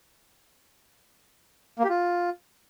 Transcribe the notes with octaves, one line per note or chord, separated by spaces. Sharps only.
A#3
G4
F4